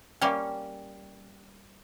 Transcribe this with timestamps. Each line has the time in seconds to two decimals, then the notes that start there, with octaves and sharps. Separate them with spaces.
0.22 G3 A#3 C#4 F5 G5